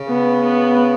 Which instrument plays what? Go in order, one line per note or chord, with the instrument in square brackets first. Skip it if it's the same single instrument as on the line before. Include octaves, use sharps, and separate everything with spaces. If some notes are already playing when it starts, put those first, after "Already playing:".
Already playing: [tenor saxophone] C#3
[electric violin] B3
B3